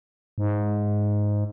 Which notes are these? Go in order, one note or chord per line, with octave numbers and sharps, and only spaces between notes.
G#2